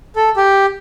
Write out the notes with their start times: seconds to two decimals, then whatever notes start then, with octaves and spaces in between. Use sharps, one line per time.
0.16 A4
0.37 G4